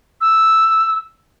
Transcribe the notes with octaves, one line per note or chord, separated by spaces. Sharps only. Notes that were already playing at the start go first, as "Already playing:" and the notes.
E6